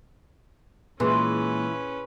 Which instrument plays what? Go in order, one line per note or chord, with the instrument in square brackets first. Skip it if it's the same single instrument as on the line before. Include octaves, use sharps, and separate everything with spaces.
[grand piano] A#2 G#3 [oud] E3 [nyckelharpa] C#4 B4 [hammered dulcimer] G#4 C6